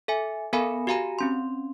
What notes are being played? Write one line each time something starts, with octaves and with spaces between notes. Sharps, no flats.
A4 E5 G#5
B3 A4 A#4 F5 G#5 B5
F#4 G4 F5 G#5 A#5 B5
C4 C#4 C6